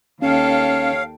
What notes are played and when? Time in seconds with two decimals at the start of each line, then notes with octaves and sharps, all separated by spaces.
0.22 D#2 C#4 A4 C#5 F5 G5